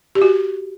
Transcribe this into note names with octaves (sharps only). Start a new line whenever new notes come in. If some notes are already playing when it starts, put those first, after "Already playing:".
G4
F#4